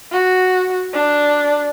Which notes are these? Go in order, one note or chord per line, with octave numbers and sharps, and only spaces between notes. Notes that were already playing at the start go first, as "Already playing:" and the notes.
F#4
D4